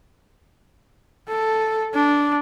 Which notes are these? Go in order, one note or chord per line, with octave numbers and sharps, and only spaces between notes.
A4
D4